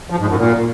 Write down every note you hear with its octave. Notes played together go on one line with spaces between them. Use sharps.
F3
G#2
F#2
A#2